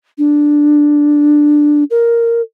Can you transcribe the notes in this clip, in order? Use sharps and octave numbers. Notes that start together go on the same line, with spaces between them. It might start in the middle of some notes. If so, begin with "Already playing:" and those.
D4
A#4